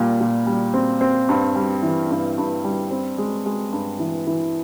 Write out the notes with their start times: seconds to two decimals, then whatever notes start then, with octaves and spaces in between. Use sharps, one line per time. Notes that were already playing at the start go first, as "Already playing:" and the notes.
Already playing: A#2 G3
0.21 A#2
0.46 G3
0.74 C4
1.01 C4
1.29 G2
1.56 G3
1.83 E3
2.11 G2
2.38 G2
2.64 G3
2.91 C4
3.18 G#3
3.46 G#3
3.73 G2
3.99 E3
4.27 E3